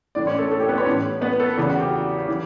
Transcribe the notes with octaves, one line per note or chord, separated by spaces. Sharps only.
A2 E3 D4 D5
C#4 C#5
A3 A4
A3 A4
G4
B3 B4
C#4 C#5
A2 E3
B3 B4
A3 A4
E2 C#3 E3
F#4
G4
E3